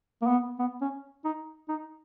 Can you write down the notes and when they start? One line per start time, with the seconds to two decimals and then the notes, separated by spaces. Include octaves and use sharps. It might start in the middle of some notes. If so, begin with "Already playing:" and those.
0.22 A#3
0.27 B3
0.59 B3
0.81 C#4
1.25 D#4
1.69 D#4